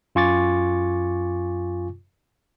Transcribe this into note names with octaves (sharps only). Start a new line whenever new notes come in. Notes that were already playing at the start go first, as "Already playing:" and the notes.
F#2 F4 G#5 C#6 D6 A6